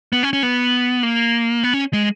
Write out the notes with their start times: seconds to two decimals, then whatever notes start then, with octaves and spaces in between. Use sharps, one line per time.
0.13 B3
0.23 C#4
0.33 C#4
0.43 B3
1.03 A#3
1.64 B3
1.73 C#4
1.93 G#3